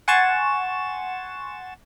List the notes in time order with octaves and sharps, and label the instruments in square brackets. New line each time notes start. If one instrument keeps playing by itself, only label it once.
[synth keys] F#5 G#5 C6 C#6 A6 E7